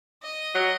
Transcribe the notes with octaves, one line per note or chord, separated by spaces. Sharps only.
D#5
F#3